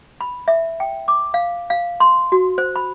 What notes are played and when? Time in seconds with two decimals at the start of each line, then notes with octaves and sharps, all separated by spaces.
0.21 B5
0.48 E5
0.80 G5
1.08 D6
1.34 F5
1.70 F5
2.00 C6
2.32 F#4
2.58 C5
2.76 B5